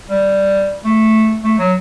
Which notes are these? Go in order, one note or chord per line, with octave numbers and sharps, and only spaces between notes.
G3
A3
A3
F#3